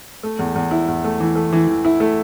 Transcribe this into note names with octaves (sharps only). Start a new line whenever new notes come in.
A3
E2
E2
E4
E2
A3
E3
A3
E3
E3
E4
A3